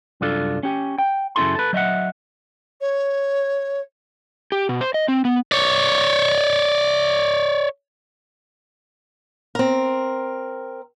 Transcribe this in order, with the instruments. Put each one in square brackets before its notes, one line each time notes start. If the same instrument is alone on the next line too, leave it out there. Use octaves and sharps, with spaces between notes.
[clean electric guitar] C2 F#2 D4 F4 A4
C#4 G4
G5
F#2 C#3 C#4 E4 A4 C6
A4 B4
F#3 D#5 E5 F#5
[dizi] C#5
[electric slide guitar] G4
B2
C5
D#5
C4
B3
[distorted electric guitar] C#5 D5
[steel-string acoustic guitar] C4 A#4